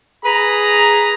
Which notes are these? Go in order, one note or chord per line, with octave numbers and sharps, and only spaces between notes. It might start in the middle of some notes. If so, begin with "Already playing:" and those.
G#4 B4 A#5